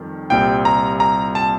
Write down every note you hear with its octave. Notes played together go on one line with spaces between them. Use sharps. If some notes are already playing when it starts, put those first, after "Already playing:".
Already playing: F2 D#3 G3
C2 A#2 G3 C4 G5
A#5
A#5
A5